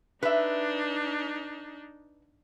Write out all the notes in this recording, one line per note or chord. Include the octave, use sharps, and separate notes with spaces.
D4 D#4 B4 E5